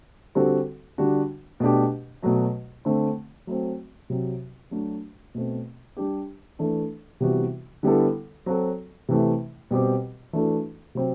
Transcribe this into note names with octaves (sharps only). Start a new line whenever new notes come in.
D3 G3 C4 F#4 A4
D3 G3 D4 F#4
B2 A3 D4 G4
B2 F#3 A3
D3 A3 C4
F#3 A3 C4
C3 F#3 C4
F#3 A3 D4 F#4
B2 A3 C4
G3 D4 G4
E3 A3 D4 A4
C3 E3 G3 B3 F#4
D3 G3 B3 E4 A4
F#3 C4 F#4 A4
C3 E3 A3
B2 G3 C4 G4
E3 A3 D4 F#4 A4
C3 F#3 C4 G4